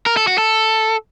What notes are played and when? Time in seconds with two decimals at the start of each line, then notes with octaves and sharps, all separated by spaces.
0.06 A#4
0.17 A4
0.27 F#4
0.38 A4